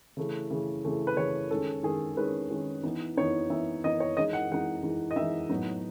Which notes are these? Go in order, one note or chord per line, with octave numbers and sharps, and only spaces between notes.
C#3 E3 A3
C#3 E3 A3
C#3 E3 A3
B4
C#3 E3 A3 C#5
D#3 G#3 C#4 A4
D#3 G#3 C#4 G#4
D#3 G#3 C#4 B4
D#3 G#3 C#4
E3 B3 D#4
E3 B3 D#4 C#5
E3 B3 D#4 E5
E3 B3 D#4 D#5
C#5
E3 G#3 D#4 D#5
F#5
E3 G#3 D#4 F#5
E3 G#3 D#4
D#5
E3 G#3 D#4 E5
A2 F#3 B3 D#4